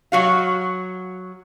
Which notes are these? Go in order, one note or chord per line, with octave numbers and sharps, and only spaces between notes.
F#3 F#4 F5